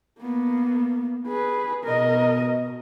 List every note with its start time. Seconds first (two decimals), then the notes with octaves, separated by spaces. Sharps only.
0.20 A#3 B3
1.28 G#4 B4
1.84 B2 A#4 D#5